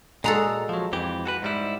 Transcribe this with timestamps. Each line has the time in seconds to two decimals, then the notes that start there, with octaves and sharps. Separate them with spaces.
0.24 A#2 G#3 F#4 A4 A#5
0.69 F3 F#3
0.93 F2 E3 G4
1.25 F#4 A4 B4
1.42 G#2 G3 E4